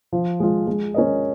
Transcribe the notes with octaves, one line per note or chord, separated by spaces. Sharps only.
F3
G#3 F4
G#3
C#4 A#4 D#5